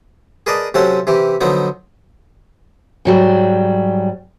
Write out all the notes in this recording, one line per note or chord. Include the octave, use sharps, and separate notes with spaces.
G#4 A#4 B4 D5 D#5 A5
C3 F#3 C4 C#4 A4 F#5
C3 E3 G4
D3 F3 F#3 B3 D#4
G#2 F#3 G3